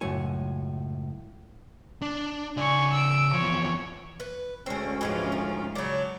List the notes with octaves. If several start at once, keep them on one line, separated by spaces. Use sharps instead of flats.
C#2 F#2 A2 C#5 G#5
D4
C#3 D5 G#5 C#6
E6 D7
E2 F3 C#5
B4
D2 D3 G#3 C4 C#4
G#2 E3 F3 G#3 G4
D#3
C#3 F#3 D4